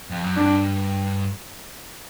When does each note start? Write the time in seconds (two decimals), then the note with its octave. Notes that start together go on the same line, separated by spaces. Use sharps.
0.10 F2
0.24 F#2
0.37 G2 D4